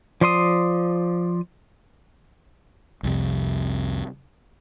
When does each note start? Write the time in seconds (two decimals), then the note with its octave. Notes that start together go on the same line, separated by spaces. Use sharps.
0.21 F3 D5 C6 D#6
3.03 C2 F2 C3